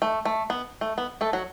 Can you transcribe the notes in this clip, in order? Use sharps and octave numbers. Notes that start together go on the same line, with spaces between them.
A3
A3
B3
A3
B3
A3 A4
F#3 F#4